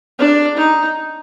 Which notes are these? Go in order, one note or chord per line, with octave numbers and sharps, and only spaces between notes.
D4
D#4